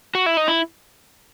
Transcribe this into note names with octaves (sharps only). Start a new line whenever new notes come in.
F#4
E4
D#4
E4